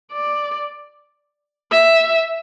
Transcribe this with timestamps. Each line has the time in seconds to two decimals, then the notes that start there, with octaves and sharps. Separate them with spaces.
0.13 D5
1.72 E5